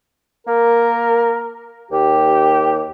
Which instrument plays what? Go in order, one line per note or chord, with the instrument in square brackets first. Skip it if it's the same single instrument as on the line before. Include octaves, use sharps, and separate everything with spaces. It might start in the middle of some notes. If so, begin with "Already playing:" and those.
[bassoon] A#3 [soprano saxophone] A#4
[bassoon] D#2 [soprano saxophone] G4